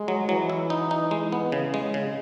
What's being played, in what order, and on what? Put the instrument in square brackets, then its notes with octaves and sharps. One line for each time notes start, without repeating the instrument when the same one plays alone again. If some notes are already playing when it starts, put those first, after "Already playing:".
Already playing: [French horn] G#3
[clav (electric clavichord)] F#3
[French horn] E3 [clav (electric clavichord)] F#3
[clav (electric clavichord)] E4
D#4
D#4
G#3
B3
C#3
G#3
C#3